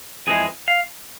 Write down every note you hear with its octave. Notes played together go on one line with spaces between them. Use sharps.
F2 E3 G#3 G#4
F5